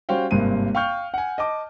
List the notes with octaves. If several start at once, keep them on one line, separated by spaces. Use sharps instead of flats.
G3 C#4 F#4 C5 F5 G5
G#1 G2 C3 A#3 C5 D#7
F5 G5 C#6 F6 G6
F#5 G#5
D#5 A5 D6